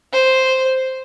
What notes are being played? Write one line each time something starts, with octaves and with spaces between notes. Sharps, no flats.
C5